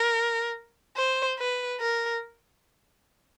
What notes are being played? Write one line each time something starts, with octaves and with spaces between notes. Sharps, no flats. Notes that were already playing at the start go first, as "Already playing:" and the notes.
Already playing: A#4
C5
B4
A#4